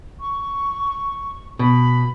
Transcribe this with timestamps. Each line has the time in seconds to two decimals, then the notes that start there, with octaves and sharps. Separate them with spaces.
0.19 C#6
1.59 B2 B5